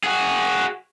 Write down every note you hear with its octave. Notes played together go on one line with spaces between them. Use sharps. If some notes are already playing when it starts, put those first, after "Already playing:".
F#4 G#4